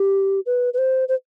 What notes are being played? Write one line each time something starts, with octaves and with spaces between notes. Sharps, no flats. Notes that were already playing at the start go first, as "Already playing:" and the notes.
Already playing: G4
B4
B4
C5
C5